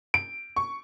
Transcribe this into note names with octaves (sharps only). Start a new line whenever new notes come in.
D7
C#6